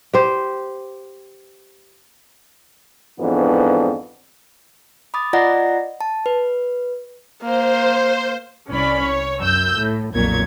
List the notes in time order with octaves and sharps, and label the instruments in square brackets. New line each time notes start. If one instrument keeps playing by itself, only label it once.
[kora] G4 C5
[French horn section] F2 G#2 E3 B3 D4
[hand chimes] B5 D6 D#6 A6
F4 D5 D#5 F#5 A#5 A#6
A5
B4
[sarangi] A#3 [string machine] C5
[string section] C2 C#4 D5 B5
C#5
F#2 E6 G6
A2
B1 F2 A#2 C#5 G#6